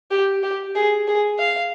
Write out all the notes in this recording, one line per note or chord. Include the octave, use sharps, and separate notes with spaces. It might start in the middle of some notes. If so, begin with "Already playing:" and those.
G4
G4
G#4
G#4
F5